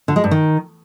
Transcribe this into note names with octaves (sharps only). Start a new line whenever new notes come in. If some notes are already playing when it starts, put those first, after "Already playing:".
D3
G#3
G2
D#3